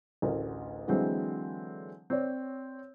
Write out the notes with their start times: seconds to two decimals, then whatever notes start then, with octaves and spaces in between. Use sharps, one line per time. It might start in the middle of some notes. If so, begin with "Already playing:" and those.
0.22 A1 D2 D3 A#4
0.88 D3 E3 F#3 G#3 C4
2.10 C4 C#5 D5